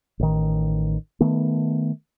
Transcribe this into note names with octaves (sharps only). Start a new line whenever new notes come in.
A1 D#3
D#3 A3 B3